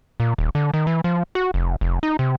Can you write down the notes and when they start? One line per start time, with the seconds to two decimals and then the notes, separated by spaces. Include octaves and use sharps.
0.20 A#2
0.38 D#1
0.55 D3
0.74 D#3
0.87 E3
1.04 F3
1.35 F#4
1.54 F1
1.81 F1
2.03 D#4
2.19 C3